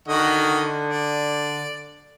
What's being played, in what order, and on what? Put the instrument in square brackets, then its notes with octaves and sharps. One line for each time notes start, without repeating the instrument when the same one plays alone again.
[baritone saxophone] D3 [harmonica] D#3 F#4 D#5
[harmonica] D5